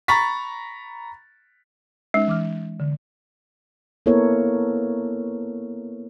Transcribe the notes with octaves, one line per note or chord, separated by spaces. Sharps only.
A#5 B5 C#6 A6 B6
G#3 C#4 D#4
E3 D6 F6
D3
A#3 B3 E4 A4 A#4 C#5